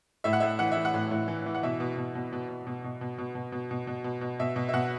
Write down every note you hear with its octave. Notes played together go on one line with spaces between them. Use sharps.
A2 E5
F#5
A2 E5
E3 F#5
E5
E3
F#5
A2
A2
E3
E3
F#5
B2 E5
B2
B2
B2
B2
B2
B2
B2
B2
B2
B2
B2
B2
B2
B2
B2
B2 E5
B2
E5
B2 F#5